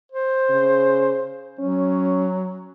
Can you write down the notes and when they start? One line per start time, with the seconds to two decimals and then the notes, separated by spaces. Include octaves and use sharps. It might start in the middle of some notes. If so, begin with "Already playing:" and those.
0.12 C5
0.50 C#3
1.59 F#3 C#4